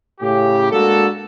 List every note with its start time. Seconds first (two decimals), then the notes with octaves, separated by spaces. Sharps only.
0.20 A2 C#3 G4
0.71 G#3 A#3 D4 F#4 A4